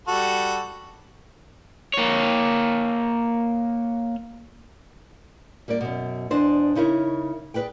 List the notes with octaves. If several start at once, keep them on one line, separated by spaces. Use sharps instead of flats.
G3 F#4 A4
A#3 C#5
G3 A#3 A#4 D5
F#2 B2
E2 D4 C5 D5 D#5
C#3 D#4 E4 A#4 B4 C#5
G#4 A#4 B4 D5 G5